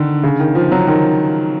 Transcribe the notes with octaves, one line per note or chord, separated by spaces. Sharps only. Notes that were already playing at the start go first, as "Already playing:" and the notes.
Already playing: D3 D#3
C#3
D#3
F3
F#3
D#3